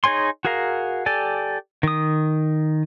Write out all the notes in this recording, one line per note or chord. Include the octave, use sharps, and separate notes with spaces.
D#4 G#4 C#5 G#5 C6
F#4 G#4 A#4 F5 A#5
G4 A4 D5 G#5
D#3 D#6